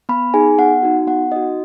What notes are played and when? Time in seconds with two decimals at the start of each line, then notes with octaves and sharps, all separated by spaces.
0.09 B3 B5
0.34 D#4 G#4 G#5
0.58 B3 F#5
0.83 D#4 F#4
1.07 B3 F#5
1.32 D#4 F#4 D#5